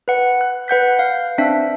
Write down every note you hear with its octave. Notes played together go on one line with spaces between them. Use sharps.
B4 F#5
F#6
B4 F#5 G6 B6
F5
C4 D4 E5 B6